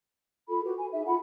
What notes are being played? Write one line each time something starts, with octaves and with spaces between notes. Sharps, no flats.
F4 A4 B5
F#4 G4 B4
G#5
D#4 G#4 E5
F4 A4 F#5 B5